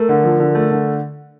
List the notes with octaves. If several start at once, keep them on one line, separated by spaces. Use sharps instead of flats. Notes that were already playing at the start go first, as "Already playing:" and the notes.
Already playing: A3 A#4
D3
F3
D3
A3
D3